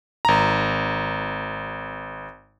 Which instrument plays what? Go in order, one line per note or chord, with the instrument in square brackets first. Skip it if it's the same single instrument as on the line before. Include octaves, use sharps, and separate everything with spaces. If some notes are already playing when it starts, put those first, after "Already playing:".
[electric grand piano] G#1 A#5